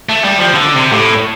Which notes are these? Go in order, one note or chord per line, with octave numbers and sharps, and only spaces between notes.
A3
G3
F3
D3
C3
A2